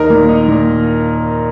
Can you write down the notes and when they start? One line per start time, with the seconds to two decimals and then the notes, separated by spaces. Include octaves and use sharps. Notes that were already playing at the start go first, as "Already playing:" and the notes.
Already playing: D#2 D#4 A#4
0.10 A#2
0.29 D#4
0.48 A#2